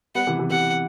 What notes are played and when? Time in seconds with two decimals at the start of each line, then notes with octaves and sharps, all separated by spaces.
0.15 G3 B3 F#5
0.27 C3 E3
0.39 C3 E3
0.50 C3 F#5